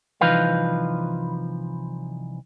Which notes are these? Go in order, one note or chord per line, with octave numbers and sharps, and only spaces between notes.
C2 E3 F3 D#4 B4 F5